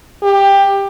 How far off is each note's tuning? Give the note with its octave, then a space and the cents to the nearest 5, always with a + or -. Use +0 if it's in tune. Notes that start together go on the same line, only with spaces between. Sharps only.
G4 +15